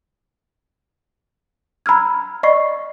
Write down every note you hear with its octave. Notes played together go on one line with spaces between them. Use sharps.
A#5 B5 E6 F6 G#6
D5 D#5 B5 C#6 C7